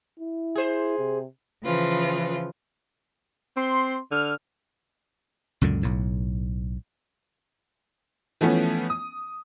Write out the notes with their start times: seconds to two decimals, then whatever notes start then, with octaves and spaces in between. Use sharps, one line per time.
0.20 E4
0.55 G#4 C5
0.99 C3
1.64 C#3 E3 F3 F4 B4
3.57 C4 C6
4.11 D3 F6
5.61 C#2 F#2 A#2 D3
5.83 B1 A2
8.41 E3 F3 A3 B3 C#4
8.90 D#6